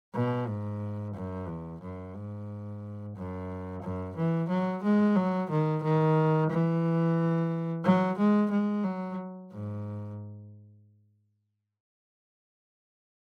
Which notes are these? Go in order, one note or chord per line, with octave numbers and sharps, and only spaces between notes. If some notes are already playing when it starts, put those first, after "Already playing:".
B2
G#2
F#2
E2
F#2
G#2
F#2
F#2
E3
F#3
G#3
F#3
D#3
D#3
E3
F#3
G#3
G#3
F#3
G#2